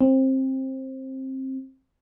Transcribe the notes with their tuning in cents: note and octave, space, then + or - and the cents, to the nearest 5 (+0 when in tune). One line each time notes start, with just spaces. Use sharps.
C4 +20